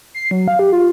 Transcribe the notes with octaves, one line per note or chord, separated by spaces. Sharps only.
C7
F#3
F5
G4
F4